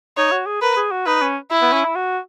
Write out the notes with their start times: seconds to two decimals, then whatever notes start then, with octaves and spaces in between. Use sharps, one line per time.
0.17 D#4 C#5
0.32 F#4
0.46 G#4
0.62 A#4 B4
0.76 G#4
0.91 F#4
1.06 D#4 B4
1.21 C#4
1.51 E4
1.62 B3
1.73 C#4
1.84 E4
1.95 F#4